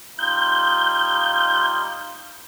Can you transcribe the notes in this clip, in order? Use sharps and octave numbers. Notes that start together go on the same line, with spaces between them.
G3 D#4 F4 G6